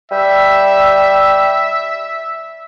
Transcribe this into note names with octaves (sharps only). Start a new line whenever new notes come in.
G3 E5